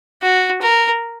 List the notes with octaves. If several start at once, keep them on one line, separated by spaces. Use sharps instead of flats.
F#4
A#4